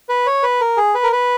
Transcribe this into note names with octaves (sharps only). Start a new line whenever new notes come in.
B4
C#5
B4
A#4
G#4
B4
A#4
B4